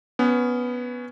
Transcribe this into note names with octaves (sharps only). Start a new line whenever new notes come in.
B3 C#4